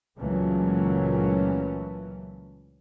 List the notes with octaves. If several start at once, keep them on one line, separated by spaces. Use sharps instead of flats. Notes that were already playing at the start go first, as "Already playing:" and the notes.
C#2 A#2 E3 F#3 A3 C#4